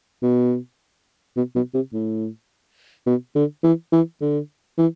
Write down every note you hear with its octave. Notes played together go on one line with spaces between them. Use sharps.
B2
B2
B2
C3
A2
B2
D3
E3
E3
D3
E3